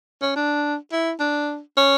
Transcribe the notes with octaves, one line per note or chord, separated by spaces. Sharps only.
C#4
D4
E4
D4
C#4